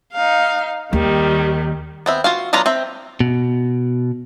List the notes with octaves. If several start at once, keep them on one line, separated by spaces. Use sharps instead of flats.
D#4 F5
D#2 D#3 G3
B3 C4 E5
F4 F#4 F5
F#3 B3 D4 F4 A#5
C4 E5
B2